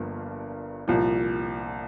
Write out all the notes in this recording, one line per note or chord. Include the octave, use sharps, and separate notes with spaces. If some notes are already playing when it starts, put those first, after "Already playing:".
Already playing: G1 G2 F3 A#3
C2 A#2 F3